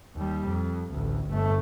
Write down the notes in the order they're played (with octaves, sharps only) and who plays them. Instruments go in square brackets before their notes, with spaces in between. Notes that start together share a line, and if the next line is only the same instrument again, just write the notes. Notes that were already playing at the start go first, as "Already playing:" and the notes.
[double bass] D#2 G3
F2
A1 D2
G1 A3